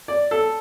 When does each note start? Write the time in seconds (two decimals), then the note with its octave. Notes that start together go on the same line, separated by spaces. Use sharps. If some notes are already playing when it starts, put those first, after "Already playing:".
0.08 D5
0.31 A4